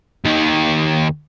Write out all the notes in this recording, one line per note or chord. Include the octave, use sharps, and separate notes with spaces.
D#2 D#3